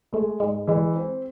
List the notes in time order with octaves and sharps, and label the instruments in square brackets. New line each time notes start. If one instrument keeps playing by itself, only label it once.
[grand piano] G#3 [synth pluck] A3
[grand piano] G#2 [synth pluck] G#3
[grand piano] E3 [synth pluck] G#3
[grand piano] C4